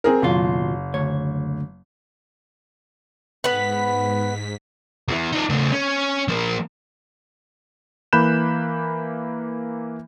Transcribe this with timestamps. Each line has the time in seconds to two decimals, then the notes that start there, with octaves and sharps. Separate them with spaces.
0.04 C4 G#4 A#4
0.22 F#1 D#2 B2 F4
0.94 D2 C#5
3.44 G#2 B3 B4 B6
5.09 E2 E3
5.33 D#4 D5
5.50 C#3 A3
5.72 C#4
6.28 F3 A#3
8.13 E3 A#3 B5 F#6 G6 E7